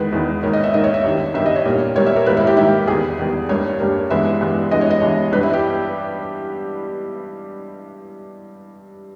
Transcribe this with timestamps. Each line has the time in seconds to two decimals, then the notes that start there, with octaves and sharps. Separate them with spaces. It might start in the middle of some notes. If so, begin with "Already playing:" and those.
Already playing: E2 D#3 G#3 B3 B4
0.12 E2 D#3 G#3 B3
0.43 G#2 D#3 A#3 C#5
0.53 D#5
0.63 E5
0.74 G#2 D#3 A#3 D#5
0.84 C#5
0.94 E5
1.05 G2 D#3 G3
1.34 G2 D#3 G3 E5
1.46 D#5
1.56 C#5
1.65 A#2 G3 A#3
1.96 A#2 G3 A#3 C#5
2.06 E5
2.16 A#4
2.26 G#2 D#3 G3 A#3 B4
2.37 E4
2.47 G4
2.57 G#2 D#3 G3 A#3 E4
2.87 E2 D#3 G3 G#4
3.19 E2 D#3 G3
3.49 G2 G3 A#3 C#5
3.79 G2 G3 A#3
4.10 G2 E3 G#3 B3 E5
4.41 G2 E3 G#3 B3
4.71 G2 E3 G#3 B3 D#5
4.81 C#5
4.91 D#5
5.02 G2 E3 G#3 B3
5.32 G2 G3 B3 B4
5.43 E4
5.53 G4